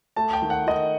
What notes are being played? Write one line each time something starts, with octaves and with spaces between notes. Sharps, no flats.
A3 A5
G5
D#3
F#5
D#3 D#5